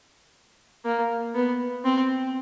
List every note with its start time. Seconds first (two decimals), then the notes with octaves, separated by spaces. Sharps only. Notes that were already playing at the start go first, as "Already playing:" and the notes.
0.85 A#3
1.35 B3
1.84 C4